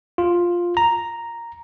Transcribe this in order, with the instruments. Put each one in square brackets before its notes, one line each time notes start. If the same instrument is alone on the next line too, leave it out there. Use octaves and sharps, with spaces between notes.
[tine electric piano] F4
A#5